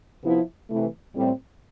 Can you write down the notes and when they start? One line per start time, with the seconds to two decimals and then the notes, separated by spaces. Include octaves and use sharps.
0.24 C3 F3 B3 E4
0.68 C3 E3 A3
1.14 A2 G3 C4